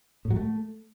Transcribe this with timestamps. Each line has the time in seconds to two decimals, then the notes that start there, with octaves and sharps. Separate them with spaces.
0.25 A2
0.31 F#3
0.36 A3